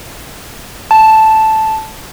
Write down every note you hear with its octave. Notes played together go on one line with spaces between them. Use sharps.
A5